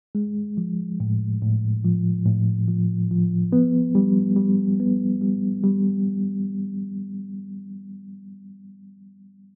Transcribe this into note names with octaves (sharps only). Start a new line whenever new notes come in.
G#3
F3
A2
A2
F3
A2
F3
F3
B3
G3
G3
B3
G3
G3